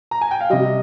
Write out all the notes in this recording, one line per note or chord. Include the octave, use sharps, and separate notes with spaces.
A#5
G#5
G5
F5
C3 G3 D#5